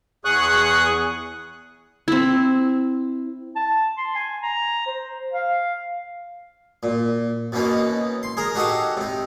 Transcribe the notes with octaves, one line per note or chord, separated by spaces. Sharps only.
E2 G#4 C#6 D#6 F#6
C4 E4
A5
C6
G#5
A#5
C5
F5
A#2
B2 E3 A#3 C#4 D#4
C6
G#4 A#4 A#5
D#4 F#4 G4 A4 D#5 F5
C3 D#4